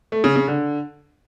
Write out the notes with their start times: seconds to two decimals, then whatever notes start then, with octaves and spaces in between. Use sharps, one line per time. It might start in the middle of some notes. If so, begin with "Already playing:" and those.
0.12 A3
0.24 C#3
0.36 C#3
0.48 D3